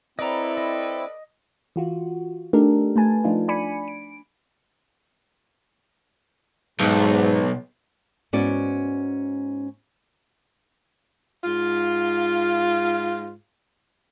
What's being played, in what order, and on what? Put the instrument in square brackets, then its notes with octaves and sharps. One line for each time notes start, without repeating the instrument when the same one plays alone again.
[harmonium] C4 E4 [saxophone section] A4 B4 D5 [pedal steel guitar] D#5 A#5
[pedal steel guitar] D#5
[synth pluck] E3 F4 F#4
A3 D4 D#4 G4 A4 A#4
A3 B4 G#5 A5
F3 A3 D4 D#4 F4
D4 D5 G#5 B5 C#7 D#7
D7
[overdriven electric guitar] B1 [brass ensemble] G#2
[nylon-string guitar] G#2 B3 C#4 F#4 D5
[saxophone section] G#2 F4